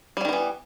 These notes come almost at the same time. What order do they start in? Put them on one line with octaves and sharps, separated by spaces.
G3 F#3 D#3 B3 E3